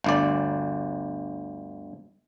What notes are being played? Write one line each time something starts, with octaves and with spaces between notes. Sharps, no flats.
G1 D2 D5